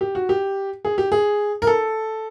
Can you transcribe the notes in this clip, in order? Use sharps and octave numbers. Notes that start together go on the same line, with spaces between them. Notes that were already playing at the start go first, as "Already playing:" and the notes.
G4
F#4
G4
G#4
G4
G#4
A#4
A4